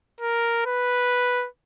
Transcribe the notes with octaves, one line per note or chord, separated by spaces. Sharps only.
A#4
B4